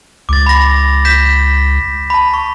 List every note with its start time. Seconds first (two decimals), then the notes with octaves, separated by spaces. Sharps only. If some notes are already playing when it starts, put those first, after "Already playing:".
0.29 C#2 D6 A6
0.46 B5 A#6
1.05 G6 B6 E7
2.10 A5 B5
2.34 C#6